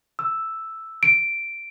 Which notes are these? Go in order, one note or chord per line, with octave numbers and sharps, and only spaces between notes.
E6
D7